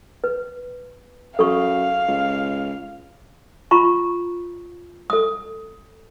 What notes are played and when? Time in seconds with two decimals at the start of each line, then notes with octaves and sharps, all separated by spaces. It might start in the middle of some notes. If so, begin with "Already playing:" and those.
0.24 B4
1.39 F#2 A4 F5 C#6
2.08 C#2
3.71 F4 A#5 B5 C#6
5.10 A4 D#6